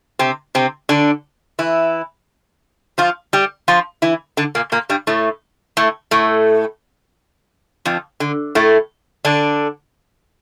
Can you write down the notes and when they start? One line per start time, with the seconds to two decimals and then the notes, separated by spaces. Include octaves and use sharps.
0.19 C3 C4
0.55 C3 C4
0.89 D3 D4
1.59 E3 E4
2.98 F3 F4
3.33 G3 G4
3.68 F3 F4
4.02 E3 E4
4.37 D3 D4
4.55 A#2 A#3
4.72 A#2 A#3
4.89 G2 G3
5.07 A2 A3
5.77 A2 A3
6.11 A2 A3
7.85 F2 F3
8.20 D3
8.55 A2 A3
9.25 D3 D4